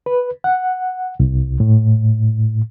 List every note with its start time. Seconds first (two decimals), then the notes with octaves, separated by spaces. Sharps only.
0.06 B4
0.44 F#5
1.20 C2
1.60 A2